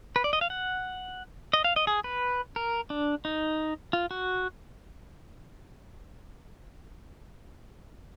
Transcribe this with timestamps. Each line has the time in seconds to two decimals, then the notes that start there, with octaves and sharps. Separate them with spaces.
0.16 B4
0.24 D5
0.33 D#5
0.41 F5
0.50 F#5
1.53 D#5
1.64 F5
1.76 D#5
1.87 G#4
2.04 B4
2.56 A#4
2.90 D4
3.25 D#4
3.93 F4
4.11 F#4